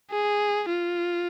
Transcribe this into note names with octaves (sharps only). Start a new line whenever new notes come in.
G#4
F4